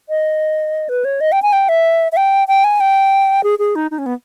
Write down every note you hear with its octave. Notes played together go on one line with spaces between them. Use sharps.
D#5
B4
C#5
D#5
G5
G#5
G5
E5
E5
G5
G5
G#5
G5
G#4
G#4
D#4
D#4
C#4
B3